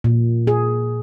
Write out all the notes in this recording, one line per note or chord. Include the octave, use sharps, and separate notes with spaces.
A#2
G#4